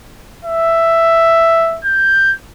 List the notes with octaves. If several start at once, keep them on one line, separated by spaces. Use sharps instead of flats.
E5
G6